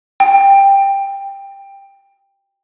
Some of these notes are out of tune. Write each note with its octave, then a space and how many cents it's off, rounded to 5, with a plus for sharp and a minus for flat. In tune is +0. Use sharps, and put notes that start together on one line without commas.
G5 +10